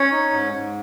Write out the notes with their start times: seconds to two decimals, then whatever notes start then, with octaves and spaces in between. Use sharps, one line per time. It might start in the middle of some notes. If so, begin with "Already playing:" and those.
Already playing: C#4 C#5
0.11 D#4
0.32 G#2
0.53 G#2